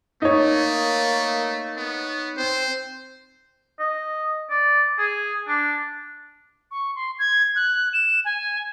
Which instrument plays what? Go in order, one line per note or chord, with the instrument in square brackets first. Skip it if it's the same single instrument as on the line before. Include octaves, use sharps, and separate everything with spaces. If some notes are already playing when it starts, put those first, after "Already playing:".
[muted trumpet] A3 [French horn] A#3 [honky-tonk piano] D#4 C#5
[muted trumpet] B3
[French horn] C4 [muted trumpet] C5
[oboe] D#5
D5
G#4
D4
[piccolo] C#6
C6
G#6
F#6
E7
G#5